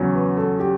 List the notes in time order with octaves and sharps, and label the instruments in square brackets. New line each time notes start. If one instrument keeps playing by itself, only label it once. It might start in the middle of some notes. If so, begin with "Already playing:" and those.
Already playing: [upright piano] E2 C#3 F#3 C#4
[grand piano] B4
A4
G4